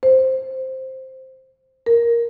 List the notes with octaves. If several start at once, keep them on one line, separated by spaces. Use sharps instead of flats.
C5
A#4